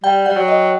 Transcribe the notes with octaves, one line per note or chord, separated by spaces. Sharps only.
G3 G5
G3 F#5
F#3
D#5